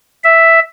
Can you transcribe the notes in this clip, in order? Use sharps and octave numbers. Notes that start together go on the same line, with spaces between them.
E5